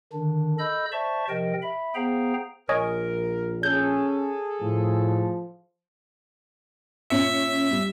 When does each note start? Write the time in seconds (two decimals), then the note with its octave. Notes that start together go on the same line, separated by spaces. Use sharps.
0.13 D3 D#3 D4
0.59 A4 D#5 B5 E6 G6
0.92 C5 D5 E5 A5 C#6
1.29 C3 F3 A#4 D#5 G5
1.62 E5 B5
1.95 B3 G#4 C5 F5 G5 A#5
2.69 A#1 A#4 C#5 D#5 G#5
3.63 C#4 G#4 A4 G6
4.62 A2 F3
7.10 A#2 C#4 E5 C#7
7.71 G3